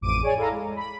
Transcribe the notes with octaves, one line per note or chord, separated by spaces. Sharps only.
A1 F2 D6 D7 D#7
G#4 C#5 D5 G#5
E4 A4 F5 A#5
G#3
B5